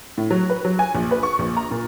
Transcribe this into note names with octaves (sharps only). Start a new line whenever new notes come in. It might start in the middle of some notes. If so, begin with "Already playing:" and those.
A2
F#3
B4
F#3
G#5
A#1
B4
C#6
A#1
A#5
A#2